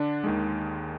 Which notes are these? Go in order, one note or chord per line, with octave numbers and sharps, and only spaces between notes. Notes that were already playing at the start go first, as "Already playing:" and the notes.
Already playing: D3 D4
D#2 D#3 G#3